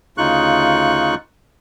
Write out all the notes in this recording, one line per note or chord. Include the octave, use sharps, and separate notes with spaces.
D2 C#3 D#4 F4 C#6 F#6